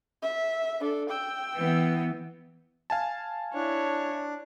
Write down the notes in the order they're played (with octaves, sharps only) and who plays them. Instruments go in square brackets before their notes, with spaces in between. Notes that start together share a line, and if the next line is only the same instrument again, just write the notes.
[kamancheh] E5
D4 A4
G5 E6
[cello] E3 B3
[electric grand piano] F5 G#5 A5
[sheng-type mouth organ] D4 [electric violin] E4 C#5